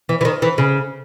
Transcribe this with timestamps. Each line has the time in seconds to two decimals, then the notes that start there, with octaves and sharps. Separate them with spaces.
0.09 E3
0.21 E3
0.25 D#3
0.42 E3
0.58 C#3